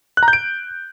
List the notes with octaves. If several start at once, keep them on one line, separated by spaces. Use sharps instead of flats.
F#6
A#5
G6
D7